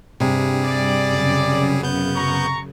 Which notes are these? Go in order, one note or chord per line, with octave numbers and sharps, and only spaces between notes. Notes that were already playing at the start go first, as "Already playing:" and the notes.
G2 C3 G3 G#4
D5
F#2 C#3
B3 G6
A#5 C#6